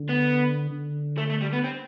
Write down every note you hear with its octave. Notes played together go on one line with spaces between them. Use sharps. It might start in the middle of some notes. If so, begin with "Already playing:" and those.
Already playing: D3
B3
D3
A3
A3
G3
B3
C4